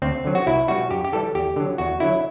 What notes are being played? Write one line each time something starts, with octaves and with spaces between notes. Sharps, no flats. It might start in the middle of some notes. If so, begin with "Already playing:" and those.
D2 C4
D3 F#3
F#4
C2 E4
B2 G3 F#4
F#2 G4
G4
E3 G3 A4
E2 G4
D3 F#3
E2 F#4
D3 F#3 E4